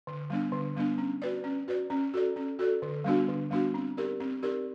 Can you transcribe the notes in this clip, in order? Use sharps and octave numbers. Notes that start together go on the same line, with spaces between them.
D3
G3 B3 D4
D3
G3 B3 D4
C#4
F#4 B4 D5
C#4
F#4 B4 D5
C#4
F#4 A4 D5
C#4
F#4 A4 D5
D3
G3 B3 D4 F#4
D3
G3 B3 D4 F#4
C4
D#4 G4 A#4 D5
C4
D#4 G4 A#4 D5